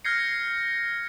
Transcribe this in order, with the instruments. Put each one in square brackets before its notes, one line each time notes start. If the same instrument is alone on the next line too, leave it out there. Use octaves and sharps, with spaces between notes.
[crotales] F6 G6 G#6 A#6 C7 C#7